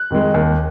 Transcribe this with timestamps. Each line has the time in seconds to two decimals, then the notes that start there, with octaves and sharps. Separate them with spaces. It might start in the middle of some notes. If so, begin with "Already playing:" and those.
Already playing: F#6
0.10 F2 D#3 G#3
0.34 D#2